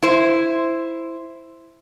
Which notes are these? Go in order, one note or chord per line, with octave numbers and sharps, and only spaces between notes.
E4 C5